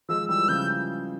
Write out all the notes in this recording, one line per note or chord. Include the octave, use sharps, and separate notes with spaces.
F3 G#3 E6
E3 G3 E6
C#3 F3 G6